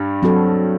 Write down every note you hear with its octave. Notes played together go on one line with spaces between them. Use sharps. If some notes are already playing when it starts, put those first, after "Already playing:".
Already playing: G2 G3
F#3 C4 F#4 A4